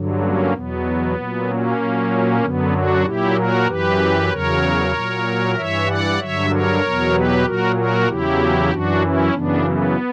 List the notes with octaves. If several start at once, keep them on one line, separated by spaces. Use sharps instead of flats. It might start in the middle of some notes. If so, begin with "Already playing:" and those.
Already playing: G2 D3 F#3
A#3 C#4
E2 B2 F#3 B3
A#2 F#3
A#3 C#4
A#2 F#3
F#2 D3 F#3 B3
D4 F#4
A#2 F#3 E4 G4
F#4 A#4
F#2 E3 G4 B4
E2 C#3 F#3 A#4 C#5
A#2 F#3
G2 E3 C#5 E5
D5 F#5
G2 D3 F#3 C#5 E5
A#4 C#5
E2 B2 F#3
G4 B4
A#2 F#3 F#4 A#4
F#4 A#4
E2 C#3 F#3 E4 G4
F#2 E3 D4 F#4
C#4 E4
F#2 C#3 E3 B3 D4
B3